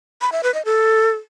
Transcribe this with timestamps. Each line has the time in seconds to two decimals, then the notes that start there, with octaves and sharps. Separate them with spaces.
0.21 B5
0.32 E5
0.43 B4
0.54 D#5
0.65 A4